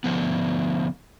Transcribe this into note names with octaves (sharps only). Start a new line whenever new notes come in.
D3 F3 B3